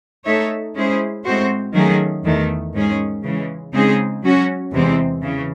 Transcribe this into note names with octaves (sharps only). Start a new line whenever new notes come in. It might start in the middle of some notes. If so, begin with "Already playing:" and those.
A3 D#4 A4 C#5 E5
G#3 C#4 E4 G#4 C5
A2 G#3 C4 F#4 C5
D#3 F#3 A3 C#4 G#4
E2 D#3 A3
G#2 D#3 G#3 C#4 G#4
C#3 E3 G#3
C#3 G#3 C4 D#4 G#4
F#3 C#4 F#4
E2 C3 E3 G#3 C4
C#3 E3